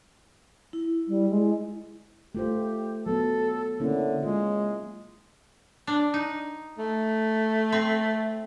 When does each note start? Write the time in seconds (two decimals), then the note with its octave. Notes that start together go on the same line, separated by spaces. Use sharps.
0.73 E4
1.08 G3
1.30 G#3
2.35 A3 F4 G4 C5
3.06 F#3 B3 A4
3.80 D3 A#3 C#4 E4
4.23 G#3 F4
5.87 D4
6.14 D#4
6.78 A3
7.72 C4